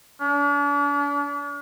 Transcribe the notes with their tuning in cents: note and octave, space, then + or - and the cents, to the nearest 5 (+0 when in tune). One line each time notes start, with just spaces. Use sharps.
D4 -40